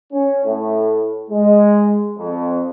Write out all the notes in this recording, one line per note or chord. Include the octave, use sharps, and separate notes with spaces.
C#4
A2
G#3
F2